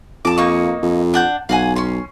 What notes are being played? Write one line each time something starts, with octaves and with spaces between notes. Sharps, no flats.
F2 A5 D6
A#3 D#4 C#6
F2
D4 F#5 G6
B1 F5 F#5 G#5
C#4 C6